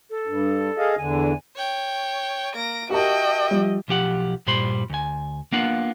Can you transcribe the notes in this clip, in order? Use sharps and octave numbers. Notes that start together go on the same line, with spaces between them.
A4
G2
G#4 D#5 F5
E2 D3 G#5
C#5 G5
A#3 A#6 D7
F#4 G4 A#4 D#5 E5 G5 A5
F3 G3
B1 F3 G4 F#5
G2 A#2 G3 C5 B5 C6
D2 G#5
A#3 B3 D4 F4 F5 F#5